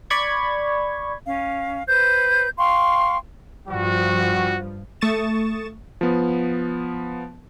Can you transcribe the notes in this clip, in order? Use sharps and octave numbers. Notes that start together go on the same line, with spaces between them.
D5 B5 C#6 G#6
C#4 F5
B4 C5 G6
F5 G5 C6 C#6
G2 F3 G3 F#4
A3 C#6 D#6 A6 E7
F3 B3